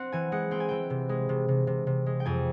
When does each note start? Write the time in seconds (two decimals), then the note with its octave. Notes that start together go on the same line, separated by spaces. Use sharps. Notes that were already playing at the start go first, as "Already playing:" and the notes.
Already playing: C4 F#5
0.12 E3 G#5
0.32 G#3 F#5
0.51 C4 G5
0.60 G#5
0.69 E3 G5
0.90 C3
1.09 G#3
1.29 C3
1.48 C3
1.67 C3
1.87 C3
2.06 G#3
2.20 G5
2.25 F2 G#5